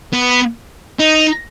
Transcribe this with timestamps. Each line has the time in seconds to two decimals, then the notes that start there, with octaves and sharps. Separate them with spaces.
0.13 B3
0.99 D#4